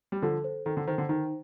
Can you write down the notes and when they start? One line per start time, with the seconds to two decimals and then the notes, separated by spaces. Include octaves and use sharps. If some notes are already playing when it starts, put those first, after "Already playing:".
0.12 G3
0.22 D3 F3 A4
0.44 C5
0.65 D#3 A4
0.77 D3
0.87 D#3 C5
0.98 D3
1.09 D#3 D#4